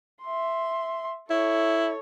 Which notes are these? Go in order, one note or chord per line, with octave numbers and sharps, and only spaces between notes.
E5 C6
E4 A4 C#5